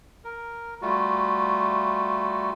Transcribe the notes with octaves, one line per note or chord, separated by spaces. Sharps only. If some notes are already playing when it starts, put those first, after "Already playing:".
A#4
G3 A3 F4 F#4